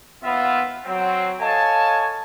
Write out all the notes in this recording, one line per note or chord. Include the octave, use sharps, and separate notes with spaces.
D#2 B3 F4 E5
F#3 C4
A4 C#5 D#5 F5 G#5 A5